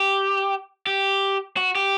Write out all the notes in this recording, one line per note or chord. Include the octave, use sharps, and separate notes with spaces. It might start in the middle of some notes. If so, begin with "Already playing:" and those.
Already playing: G4
G4
F#4
G4